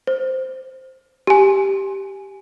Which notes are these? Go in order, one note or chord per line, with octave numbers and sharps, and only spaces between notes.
C5
G4 G#5